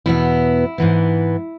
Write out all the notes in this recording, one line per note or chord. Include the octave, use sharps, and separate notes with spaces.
E2 B2 B3 E4
G#2 E3 B3